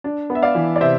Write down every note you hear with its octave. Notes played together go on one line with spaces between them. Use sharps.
D4
B3
E5
D5 F5
E3
D5
C3 C5 E5